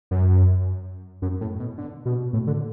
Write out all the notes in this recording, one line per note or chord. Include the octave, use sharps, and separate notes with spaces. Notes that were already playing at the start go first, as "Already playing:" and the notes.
F#2
F#2
A2
B2
D3
B2
A2
D3